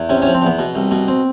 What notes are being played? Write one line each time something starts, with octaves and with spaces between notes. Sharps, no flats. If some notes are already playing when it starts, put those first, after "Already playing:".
Already playing: E2
C3 C#4
C#4
F3
C4
E2 B3
B2
C2
B2
C4